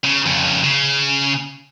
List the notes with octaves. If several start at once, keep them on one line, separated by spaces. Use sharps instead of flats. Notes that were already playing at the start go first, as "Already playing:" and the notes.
C#3
F2 C#3
C#3